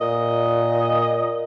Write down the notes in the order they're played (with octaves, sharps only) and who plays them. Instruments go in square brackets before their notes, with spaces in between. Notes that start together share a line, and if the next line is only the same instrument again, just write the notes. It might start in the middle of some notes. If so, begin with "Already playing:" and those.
[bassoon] A#2 [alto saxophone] D#5